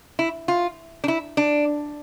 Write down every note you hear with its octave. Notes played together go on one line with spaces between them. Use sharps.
E4
F4
D4
E4
D4